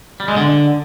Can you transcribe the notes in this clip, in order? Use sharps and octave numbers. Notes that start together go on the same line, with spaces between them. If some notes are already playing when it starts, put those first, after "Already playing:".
G3
G#3
D3